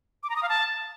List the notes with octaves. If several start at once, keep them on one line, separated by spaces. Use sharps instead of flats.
D6
A#5
D#6
F5
A5